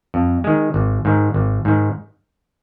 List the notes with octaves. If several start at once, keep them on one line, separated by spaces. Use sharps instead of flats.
F2
D#3 G#3
G#1
G#2 D#3
G#1
G#2 D#3